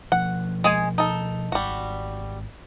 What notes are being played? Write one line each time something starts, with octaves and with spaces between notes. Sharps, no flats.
B2 F3 F#5
G#3 G#4 G#5
D#4 A4
G#1 G3 F#4